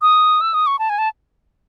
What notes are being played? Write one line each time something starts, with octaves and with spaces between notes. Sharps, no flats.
D#6
E6
D#6
C#6
A5
G#5
A5